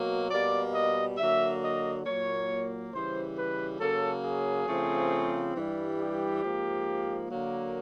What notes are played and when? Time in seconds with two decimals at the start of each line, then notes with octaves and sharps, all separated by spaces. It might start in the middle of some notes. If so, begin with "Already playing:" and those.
Already playing: B2 F#3 A#3
0.30 B2 G3 A#3 D5
0.75 D#5
1.18 D3 F#3 A#3 E5
1.62 D#5
2.05 A#2 F#3 A#3 C#5
2.92 C#3 E3 G3 C5
3.36 B4
3.80 C#3 F#3 A#3 A4
4.24 G#4
4.67 C#3 F3 A3 C4
5.55 G2 E3 G3
5.99 G4
6.43 G#2 F3 A#3
7.30 D3 F#3 A#3